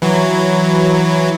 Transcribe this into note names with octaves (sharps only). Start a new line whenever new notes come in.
E3 F#3